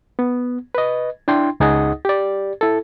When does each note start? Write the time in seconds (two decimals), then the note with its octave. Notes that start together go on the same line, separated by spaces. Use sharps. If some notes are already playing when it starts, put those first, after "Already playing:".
0.19 B3
0.75 B4 D#5
1.28 D4 E4 G5 C6
1.60 C#2 D#4 G#4 D#5 F#5 D#6
2.05 G4 D5
2.61 E4 A4